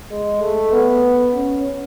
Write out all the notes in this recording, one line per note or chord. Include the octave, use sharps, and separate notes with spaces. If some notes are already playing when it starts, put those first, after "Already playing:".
G#3
A3
B3
C#4